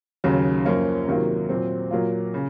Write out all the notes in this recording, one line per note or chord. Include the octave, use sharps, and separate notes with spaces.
D#2 C#3 F#3
F#2 F3 A#3 C#4 F4
C3 D#3 F#3 A#3 F4
A#2 F#3 C4
A#2 F#3 A#3 F4
C#3